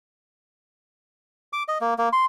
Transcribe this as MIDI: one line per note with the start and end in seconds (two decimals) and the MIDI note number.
1.53 1.63 86
1.68 1.78 75
1.81 1.94 58
1.98 2.09 58
2.13 2.25 84